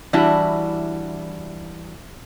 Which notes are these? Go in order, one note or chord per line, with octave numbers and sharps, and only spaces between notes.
E3 G3 D4 E4 F#4